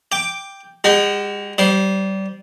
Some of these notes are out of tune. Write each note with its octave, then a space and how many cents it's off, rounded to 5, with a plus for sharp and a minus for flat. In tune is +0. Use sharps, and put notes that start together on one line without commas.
G5 +5 D6 +0
G#3 -40 F#4 +35 G5 -15
G3 -25 C5 +0